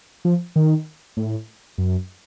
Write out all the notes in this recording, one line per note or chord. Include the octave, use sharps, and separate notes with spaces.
F3
D#3
A2
F#2